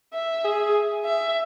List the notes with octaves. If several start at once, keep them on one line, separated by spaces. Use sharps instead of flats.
E5
G#4
E5